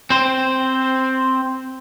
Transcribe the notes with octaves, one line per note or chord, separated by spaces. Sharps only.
C4 C5